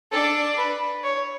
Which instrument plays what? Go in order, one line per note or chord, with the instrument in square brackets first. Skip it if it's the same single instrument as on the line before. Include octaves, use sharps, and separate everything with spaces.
[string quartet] D4 [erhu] A4
[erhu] B4
C#5